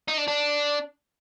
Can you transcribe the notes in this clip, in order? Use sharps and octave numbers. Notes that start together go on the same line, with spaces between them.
D#4
D4
D4